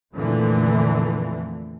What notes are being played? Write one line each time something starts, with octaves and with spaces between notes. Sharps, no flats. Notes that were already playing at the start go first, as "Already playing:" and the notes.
F2 A#2 D3 E3 A3